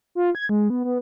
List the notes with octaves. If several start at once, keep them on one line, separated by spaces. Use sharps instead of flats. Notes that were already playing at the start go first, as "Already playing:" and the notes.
F4
G#6
G#3
B3
B3